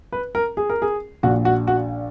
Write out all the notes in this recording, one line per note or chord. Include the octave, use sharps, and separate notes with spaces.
B4
A#4
G#4
A#4
G#4
A#1 A#2 F#4
F#4
F#4